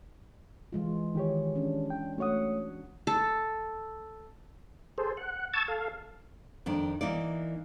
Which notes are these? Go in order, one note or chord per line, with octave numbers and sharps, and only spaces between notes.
E3 G#3 F4
D#3 E4 G4 G#4 C#5
C#4 D4
G5
A3 F#4 C#5 F#5 D#6
A4
G#4 A4 C5
F#5
A5 C#6 E6 G#6 A6
A4 F5
F2 D#3 D4
E3 A#3 D#4 D5